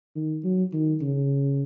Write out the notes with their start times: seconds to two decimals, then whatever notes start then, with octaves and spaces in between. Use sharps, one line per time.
0.16 D#3
0.44 F#3
0.73 D#3
1.01 C#3